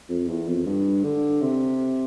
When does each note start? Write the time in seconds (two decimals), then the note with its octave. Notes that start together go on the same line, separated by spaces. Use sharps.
0.09 F2
0.28 E2
0.48 F2
0.66 G2
1.04 D3
1.42 C3